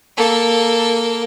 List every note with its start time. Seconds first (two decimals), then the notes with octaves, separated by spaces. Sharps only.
0.17 A#3 A4